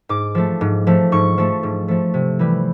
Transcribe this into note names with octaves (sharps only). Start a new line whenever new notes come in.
G#2 D6
F3 A3
G#2
F3 A3
G#2 C#6
F3 A3
G#2
F3 A3
C3
E3 G3